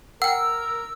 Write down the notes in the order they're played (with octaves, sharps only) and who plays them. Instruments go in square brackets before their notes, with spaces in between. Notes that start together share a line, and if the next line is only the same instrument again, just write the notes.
[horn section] A#4 [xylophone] F#5 G5 [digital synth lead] E6